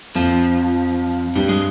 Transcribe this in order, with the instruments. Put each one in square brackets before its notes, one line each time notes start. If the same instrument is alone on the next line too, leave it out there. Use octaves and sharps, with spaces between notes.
[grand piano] F2 [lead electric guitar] F3
[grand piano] G2 [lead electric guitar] G3
[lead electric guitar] G#3